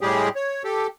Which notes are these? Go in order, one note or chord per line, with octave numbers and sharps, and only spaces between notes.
A2 G3 G#3 G4 G#4
C#5
G4 A4